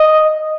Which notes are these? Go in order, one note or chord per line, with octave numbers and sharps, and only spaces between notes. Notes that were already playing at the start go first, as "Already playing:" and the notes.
Already playing: D#5